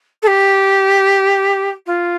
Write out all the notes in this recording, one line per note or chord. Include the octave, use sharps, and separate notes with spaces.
A4
G4
F4